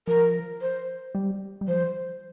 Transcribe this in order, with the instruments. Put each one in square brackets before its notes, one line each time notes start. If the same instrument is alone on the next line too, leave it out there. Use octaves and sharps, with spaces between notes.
[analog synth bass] F3 [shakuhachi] A#4
[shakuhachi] C5
[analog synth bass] G3
G3
[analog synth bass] F3 [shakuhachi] C5